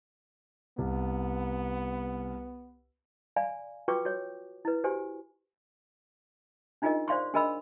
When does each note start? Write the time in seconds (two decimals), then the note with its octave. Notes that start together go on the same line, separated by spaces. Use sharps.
0.78 C2 B3
3.36 D5 F5 G#5 B5
3.88 F4 F#4 B4 G5 C#6 D6
4.05 F#4 C#5
4.65 E4 B4
4.84 F#4 G4 C5 G#5
6.82 D4 D#4 F4 G#4 A#4 D#5
7.08 C5 D5 F5 C6 C#6
7.34 D4 G#4 A#4 D#5 B5 E6